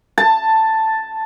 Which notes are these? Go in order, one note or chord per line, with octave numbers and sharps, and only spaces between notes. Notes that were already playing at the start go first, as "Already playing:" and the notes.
A5